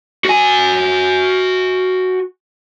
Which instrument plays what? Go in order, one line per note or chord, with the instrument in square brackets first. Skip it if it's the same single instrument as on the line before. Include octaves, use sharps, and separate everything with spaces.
[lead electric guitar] F#4 G#5